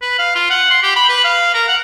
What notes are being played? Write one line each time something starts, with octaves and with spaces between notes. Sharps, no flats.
B4
F5
F4
F#5
C6
G4
B5
B4
F5
A#4
F#5